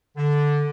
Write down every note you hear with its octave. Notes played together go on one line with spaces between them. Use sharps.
D3